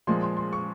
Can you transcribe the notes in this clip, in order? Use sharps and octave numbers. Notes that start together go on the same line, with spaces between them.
A#2 F3 G#3 C6
C6
C6
C#6